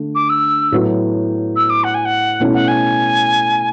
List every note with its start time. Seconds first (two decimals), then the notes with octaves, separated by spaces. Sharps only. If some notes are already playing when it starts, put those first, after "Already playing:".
Already playing: D3 A3
0.15 D6
0.30 E6
0.72 A2 F#3 B3 F#4
1.56 E6
1.70 D6
1.84 F#5
1.94 G#5
2.05 F#5
2.40 B2 A3 C#4 E4
2.54 F#5
2.68 G#5